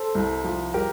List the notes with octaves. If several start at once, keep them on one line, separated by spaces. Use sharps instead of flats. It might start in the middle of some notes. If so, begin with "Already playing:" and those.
Already playing: A4 C5
C2
F3
G4 A#4